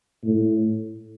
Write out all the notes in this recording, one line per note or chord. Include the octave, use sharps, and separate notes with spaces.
A2